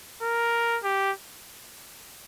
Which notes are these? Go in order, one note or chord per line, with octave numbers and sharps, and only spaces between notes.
A#4
G4